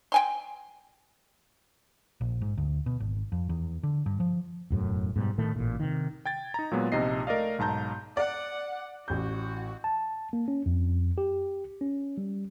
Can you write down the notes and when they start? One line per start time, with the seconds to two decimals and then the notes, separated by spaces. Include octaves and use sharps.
0.12 G5 G#5 C6
2.21 A#1
2.41 G#2
2.57 D2
2.86 B2
3.00 G#1
3.32 F2
3.49 E2
3.83 D3
4.06 G2
4.20 F3
4.70 E1 F#2 A2
5.16 G#2 B2 G3
5.38 A2 D#3 A3
5.56 A1 A#2
5.80 C3 D#3
6.26 G5 G#6 A6
6.54 D#4 A#5
6.71 A#2 F#3 G#3 B3
6.92 A#1 C3 D#4 D#5 C7
7.27 A3 A#4 D5 D#5 F5
7.59 B1 G#2 A5 A#5 G6
8.17 D5 F#5
9.08 A1 F#4 G6
9.84 A5
10.33 A#3
10.48 C#4
10.66 F2
11.18 G4
11.81 C#4
12.18 G3